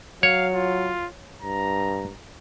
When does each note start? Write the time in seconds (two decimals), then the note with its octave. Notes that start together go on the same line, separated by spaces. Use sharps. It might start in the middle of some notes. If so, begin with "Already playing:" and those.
0.23 F#3 C#5 F5
0.54 F4
1.42 G2 A#5